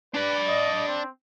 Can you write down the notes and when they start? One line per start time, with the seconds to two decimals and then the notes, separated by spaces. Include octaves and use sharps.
0.14 D4 B4 D5 B5
0.48 D#5
0.87 C4